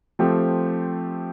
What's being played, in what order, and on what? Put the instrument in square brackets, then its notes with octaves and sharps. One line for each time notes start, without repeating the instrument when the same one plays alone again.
[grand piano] F3 A3 C4 G4